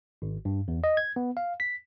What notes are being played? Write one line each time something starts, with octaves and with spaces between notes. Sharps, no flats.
G#1
G2
E2
D#5
G#6
B3
F5
B6